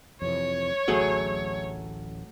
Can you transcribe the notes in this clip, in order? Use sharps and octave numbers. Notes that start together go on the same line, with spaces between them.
F2 C3 E3 C#5
D1 A1 F#3 A3 G#4